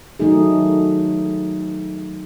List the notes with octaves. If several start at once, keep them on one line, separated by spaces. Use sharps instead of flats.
D#3 F#3 A3 D#4 G#4